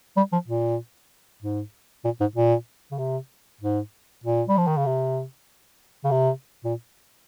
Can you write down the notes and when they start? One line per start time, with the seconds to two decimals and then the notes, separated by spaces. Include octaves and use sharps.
0.17 G3
0.33 F3
0.48 A#2
1.42 G#2
2.05 A#2
2.20 G#2
2.36 A#2
2.91 C#3
2.98 C3
3.61 G#2
4.24 A#2
4.48 G3
4.58 F3
4.67 D#3
4.77 C#3
4.86 C3
6.04 C#3
6.11 C3
6.64 A#2